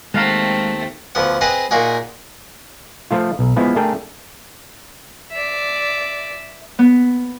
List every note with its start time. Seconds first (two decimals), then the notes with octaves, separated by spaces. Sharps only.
0.14 D#2 G#3 A3 C4 F5 F#5 A#5
1.15 D2 F3 B3 F#5
1.41 C4 G#4 B4 C5 D#5 F#5
1.71 A#2 A#3 D#4 F#4 G#4
3.11 F3 A3 F4
3.39 B1
3.56 F3 G#3 B3 E4
3.76 A3 D4 G#4 A#4 G5
5.32 D5 E5
6.79 B3